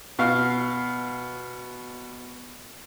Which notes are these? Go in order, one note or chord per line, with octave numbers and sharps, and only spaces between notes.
B2 F5 F6